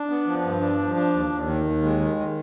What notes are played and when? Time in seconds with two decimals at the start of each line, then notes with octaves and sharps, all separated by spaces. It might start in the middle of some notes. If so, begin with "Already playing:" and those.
Already playing: D4
0.10 B3
0.27 F3
0.44 G2
0.61 D4
0.79 F3
0.96 D4
1.13 D#2
1.30 D#2
1.47 D#3
1.65 D#2
1.82 G#3
1.99 D#3
2.16 D#3